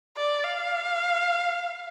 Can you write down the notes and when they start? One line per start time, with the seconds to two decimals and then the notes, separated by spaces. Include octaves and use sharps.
0.17 D5
0.44 F5